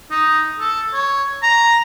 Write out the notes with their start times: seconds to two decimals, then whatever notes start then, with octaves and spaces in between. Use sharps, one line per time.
0.11 D#4
0.60 A4
0.94 C#5
1.43 A#5